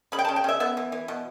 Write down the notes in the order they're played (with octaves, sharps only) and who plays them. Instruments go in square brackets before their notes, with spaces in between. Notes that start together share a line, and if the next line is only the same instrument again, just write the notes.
[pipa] C#3 B5
G5
C#3 A5
G5
C#3 E5
B3 E5
E3
E3
B2